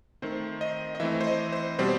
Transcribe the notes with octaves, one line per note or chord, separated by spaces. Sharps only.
D#3 A3 C4 C5
D#5
D#5
E3 A3 C4 E5
C5
D#5
C5
B2 G3 C4 C5